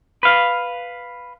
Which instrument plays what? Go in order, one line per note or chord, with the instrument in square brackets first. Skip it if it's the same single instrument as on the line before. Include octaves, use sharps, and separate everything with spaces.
[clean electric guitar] B4 F5